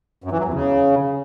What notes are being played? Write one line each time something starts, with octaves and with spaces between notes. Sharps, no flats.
F#2
E3
F#3
E2
C#3